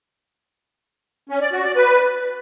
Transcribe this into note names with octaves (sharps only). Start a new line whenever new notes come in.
C#4
D5
F#4
D5
B4